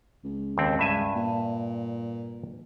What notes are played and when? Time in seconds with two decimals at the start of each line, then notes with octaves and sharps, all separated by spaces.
0.24 C#2
0.58 D#2 C4
0.79 C#2 G2 E5 G#5
1.15 A#2